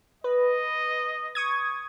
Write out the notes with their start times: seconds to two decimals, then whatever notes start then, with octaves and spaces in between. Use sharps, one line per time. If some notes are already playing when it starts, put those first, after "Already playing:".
0.24 B4 D#5
1.35 C#6 D#6 G#6